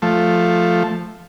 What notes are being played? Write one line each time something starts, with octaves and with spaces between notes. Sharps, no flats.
F3 A3